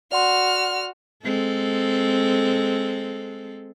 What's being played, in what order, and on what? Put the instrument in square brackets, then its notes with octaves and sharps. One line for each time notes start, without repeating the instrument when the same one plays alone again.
[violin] F#4 F6 [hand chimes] D5 F#5 C6
[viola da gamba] G#3 C4 A4